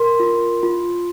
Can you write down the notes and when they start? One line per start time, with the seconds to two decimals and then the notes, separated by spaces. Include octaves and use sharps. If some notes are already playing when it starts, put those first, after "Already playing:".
Already playing: A#4 C6
0.20 F4
0.63 F4